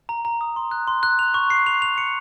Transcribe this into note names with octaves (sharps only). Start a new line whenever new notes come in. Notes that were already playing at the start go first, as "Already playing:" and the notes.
A#5
A#5
D#6
C6
F#6
C6
F#6
F7
C#6
C7
F7
F7
C#7